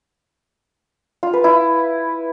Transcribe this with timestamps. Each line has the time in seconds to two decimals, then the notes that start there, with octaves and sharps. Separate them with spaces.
1.23 F4
1.33 B4
1.44 E4